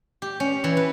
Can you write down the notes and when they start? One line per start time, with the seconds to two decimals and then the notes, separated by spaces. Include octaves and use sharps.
0.22 G4
0.40 C#4
0.64 E3
0.77 B4